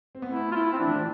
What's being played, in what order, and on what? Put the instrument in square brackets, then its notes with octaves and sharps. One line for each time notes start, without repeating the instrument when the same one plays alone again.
[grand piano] C4
B3
[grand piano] A3 [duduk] E4
[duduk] F4
E4
C4
[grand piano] E3 [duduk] D4
[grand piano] F3
E3